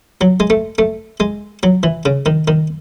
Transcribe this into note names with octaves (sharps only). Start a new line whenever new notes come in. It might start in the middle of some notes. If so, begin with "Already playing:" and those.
F#3
G#3
A3
A3
G#3
F#3
E3
C#3
D#3
D#3